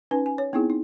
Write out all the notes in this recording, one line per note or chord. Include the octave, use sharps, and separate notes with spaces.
C#4 D#4 B4 G#5
G#5
C#5
B3 C4 D#4 E4 G#4
D#4